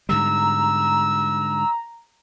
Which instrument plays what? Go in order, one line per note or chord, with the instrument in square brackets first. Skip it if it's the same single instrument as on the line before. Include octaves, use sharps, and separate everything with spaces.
[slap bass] G#2 D3 G3 [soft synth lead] A#5 [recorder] E6